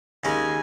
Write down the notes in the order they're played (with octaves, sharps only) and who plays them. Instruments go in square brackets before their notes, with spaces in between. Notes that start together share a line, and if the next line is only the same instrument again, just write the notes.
[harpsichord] D#2 C#3 G#3 C#4 G#4 [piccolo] G#5